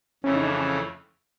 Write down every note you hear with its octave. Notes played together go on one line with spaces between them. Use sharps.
F2 C#3 E3 A3 C#4
D#4
D4
C#4